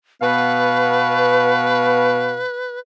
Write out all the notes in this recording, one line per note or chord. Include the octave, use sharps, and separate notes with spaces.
B2 B3 B4 F5